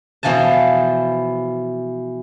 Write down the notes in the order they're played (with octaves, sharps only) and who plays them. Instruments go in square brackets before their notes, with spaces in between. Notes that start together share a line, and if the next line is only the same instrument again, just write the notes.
[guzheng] B2 E3 F3 G#5 A5